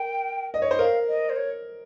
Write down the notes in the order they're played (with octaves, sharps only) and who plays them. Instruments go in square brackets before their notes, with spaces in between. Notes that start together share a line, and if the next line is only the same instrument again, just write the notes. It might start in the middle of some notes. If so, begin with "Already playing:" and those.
Already playing: [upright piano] A#4 [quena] G5
[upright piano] D#5
C#5
C5
[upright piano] A#4 [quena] F5
[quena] D#5
C5
C#5